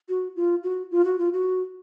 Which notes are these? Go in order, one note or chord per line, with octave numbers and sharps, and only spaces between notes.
F#4
F4
F#4
F4
F#4
F4
F#4